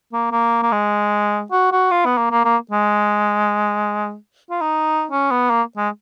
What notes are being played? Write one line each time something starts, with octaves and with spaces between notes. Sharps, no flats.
A#3
A#3
A#3
G#3
F#4
F#4
F4
B3
A#3
A#3
A#3
G#3
F4
D#4
C#4
B3
A#3
G#3